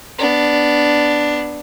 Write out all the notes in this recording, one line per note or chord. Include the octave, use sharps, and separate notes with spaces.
B3 D4